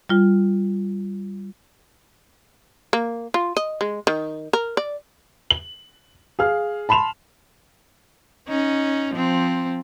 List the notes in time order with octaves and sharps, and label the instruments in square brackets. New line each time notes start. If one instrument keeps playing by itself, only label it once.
[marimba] G3 F4
[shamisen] A#3
F4
D#5
G#3
D#3
A#4
D5
[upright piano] F#7
G#4 F5 F6
A5 B5 C6 E7 F7
[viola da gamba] C#4 D#4
F3 C4